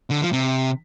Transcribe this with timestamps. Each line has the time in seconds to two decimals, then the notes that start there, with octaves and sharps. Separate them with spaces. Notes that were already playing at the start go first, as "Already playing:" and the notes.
0.11 D3
0.22 F3
0.33 C3